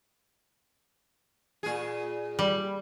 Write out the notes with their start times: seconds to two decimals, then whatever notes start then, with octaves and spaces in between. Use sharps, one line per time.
1.63 A#2 G#4
2.39 G3